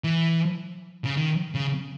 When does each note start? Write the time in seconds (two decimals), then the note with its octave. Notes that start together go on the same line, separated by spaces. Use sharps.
0.04 E3
1.05 C#3
1.17 D#3
1.55 C#3